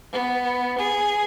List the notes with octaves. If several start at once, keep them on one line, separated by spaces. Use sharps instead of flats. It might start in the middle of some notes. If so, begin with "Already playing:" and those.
B3
G#4